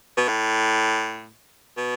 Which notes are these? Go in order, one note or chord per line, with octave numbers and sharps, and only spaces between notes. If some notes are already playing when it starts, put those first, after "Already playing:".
B2
A2
B2